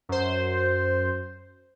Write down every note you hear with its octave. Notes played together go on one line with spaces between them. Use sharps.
F#2 C5